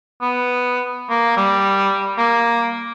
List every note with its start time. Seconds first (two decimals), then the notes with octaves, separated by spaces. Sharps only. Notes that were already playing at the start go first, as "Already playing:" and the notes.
0.22 B3
1.10 A#3
1.37 G3
2.18 A#3